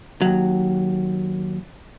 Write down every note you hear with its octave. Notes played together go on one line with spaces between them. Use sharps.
D#2 F#3